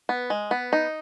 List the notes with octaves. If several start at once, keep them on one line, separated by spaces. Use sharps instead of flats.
B3
G#3
B3
D#4